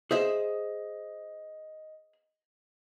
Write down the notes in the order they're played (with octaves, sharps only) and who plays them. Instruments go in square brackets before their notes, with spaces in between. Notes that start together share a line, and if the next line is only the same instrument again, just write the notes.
[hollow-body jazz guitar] G#4 C5 E5 [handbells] D#5